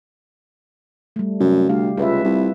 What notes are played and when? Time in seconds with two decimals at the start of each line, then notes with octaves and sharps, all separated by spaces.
1.16 G3 A3
1.40 F#2 C3
1.69 D2 G3 G4 F5
1.97 C#2 F4 B4 E5
2.24 C2